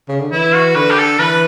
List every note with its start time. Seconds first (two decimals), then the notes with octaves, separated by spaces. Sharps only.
0.08 C#3
0.20 D3
0.32 E3 E4
0.55 F#4
0.75 D3 B4
0.91 G4
0.98 A4
1.19 E3 B4